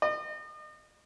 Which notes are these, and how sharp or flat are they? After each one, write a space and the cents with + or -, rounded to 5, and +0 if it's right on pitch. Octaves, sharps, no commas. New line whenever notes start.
D#5 -40